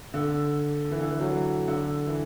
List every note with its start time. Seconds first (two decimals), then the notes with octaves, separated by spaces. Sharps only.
0.14 D3
0.91 E3
1.01 D3
1.10 E3
1.20 F#3
1.29 E3
1.68 D3
2.07 E3